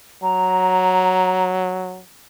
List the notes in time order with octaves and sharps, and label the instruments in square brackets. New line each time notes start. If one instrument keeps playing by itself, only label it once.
[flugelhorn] F#3 [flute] A#5